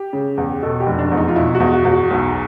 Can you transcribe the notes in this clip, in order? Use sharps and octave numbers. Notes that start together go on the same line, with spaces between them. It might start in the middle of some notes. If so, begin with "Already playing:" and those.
Already playing: G4
C#3
E2
B2 A4
G4
F1
D4
E2
D#4
F4
B2 E4
F#4
E2
F#4
E2
F#4
B1